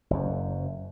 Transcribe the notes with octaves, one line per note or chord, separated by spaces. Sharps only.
F#1 F#2